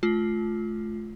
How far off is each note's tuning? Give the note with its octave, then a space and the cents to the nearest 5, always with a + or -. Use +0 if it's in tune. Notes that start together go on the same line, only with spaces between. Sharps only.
A3 -35 F4 +0